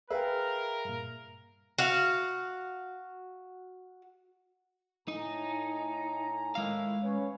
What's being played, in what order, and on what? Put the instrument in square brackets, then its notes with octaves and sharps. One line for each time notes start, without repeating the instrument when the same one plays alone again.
[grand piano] G#4 B4 [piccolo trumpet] A#4 [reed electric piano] E5 F5 G5
[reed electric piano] G2 A#2
[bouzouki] F#4 F5
[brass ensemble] A2 G#5 A#5 [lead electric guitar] D#4
[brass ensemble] A2 D#3 E4 [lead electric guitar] G#3 F5
[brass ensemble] C#4 B4 C#5